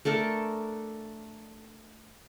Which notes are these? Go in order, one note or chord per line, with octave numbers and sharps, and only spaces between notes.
A3 D4 A4 A#4